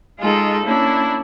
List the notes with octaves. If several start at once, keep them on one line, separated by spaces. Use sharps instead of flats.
G#3 D#4 F4 G#4 A4
A#3 C#4 D4 E4